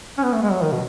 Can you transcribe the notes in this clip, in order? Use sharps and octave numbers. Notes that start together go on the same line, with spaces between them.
C#4
B3
A3
G#3
F#3
D#3
B2